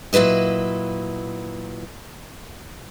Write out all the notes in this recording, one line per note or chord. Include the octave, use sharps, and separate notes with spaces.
A#2 F#3 E4 B4 D#5